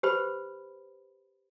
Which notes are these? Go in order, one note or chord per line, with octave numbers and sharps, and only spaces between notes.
G4 B4 C5 B5